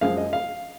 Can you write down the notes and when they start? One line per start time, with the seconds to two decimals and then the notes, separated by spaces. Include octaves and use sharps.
0.01 F#2 F3 G#3 F5
0.18 D#5
0.33 F5